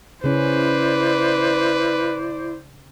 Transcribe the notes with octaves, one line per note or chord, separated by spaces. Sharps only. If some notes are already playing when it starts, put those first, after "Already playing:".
C#3 C#4 E4 B4 C5 D5